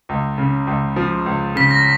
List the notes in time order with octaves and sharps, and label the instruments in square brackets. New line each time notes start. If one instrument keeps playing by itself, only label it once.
[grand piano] C#2
C#3
C#2
F3
C#2
[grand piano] C#3 [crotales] B6
[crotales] A#6